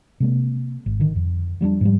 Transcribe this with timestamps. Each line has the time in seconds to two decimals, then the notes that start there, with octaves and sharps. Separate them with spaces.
0.20 C3 G#3 A#3
0.86 G#1
1.00 D3 D#3
1.16 F2
1.61 F3 G3 A3 D4
1.81 G#2 F3 G3